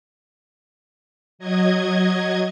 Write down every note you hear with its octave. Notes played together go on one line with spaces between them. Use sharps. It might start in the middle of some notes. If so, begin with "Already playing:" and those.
F#3 D#5 G#6